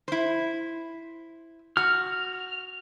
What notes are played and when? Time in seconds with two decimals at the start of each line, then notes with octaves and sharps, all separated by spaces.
0.08 E4 C5
1.77 F#4 F6